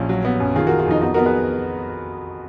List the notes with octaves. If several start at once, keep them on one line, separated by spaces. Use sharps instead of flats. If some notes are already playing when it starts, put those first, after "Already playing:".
Already playing: A#1 C#4 F4
F#3
B3
F#2
D#3 F4 G#4
D#3 F#4 A#4
F4 G#4
F2 D#4
B3 D#4 F#4
B3 F#4 A#4
G#4 B4